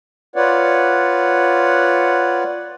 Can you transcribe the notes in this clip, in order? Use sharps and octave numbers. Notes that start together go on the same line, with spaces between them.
F4 B4 C#5 D5 F#5